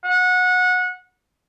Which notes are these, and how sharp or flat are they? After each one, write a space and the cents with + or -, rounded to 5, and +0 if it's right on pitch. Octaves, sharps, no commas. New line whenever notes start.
F#5 -25